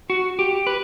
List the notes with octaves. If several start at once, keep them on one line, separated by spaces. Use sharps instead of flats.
F#4
G4
B4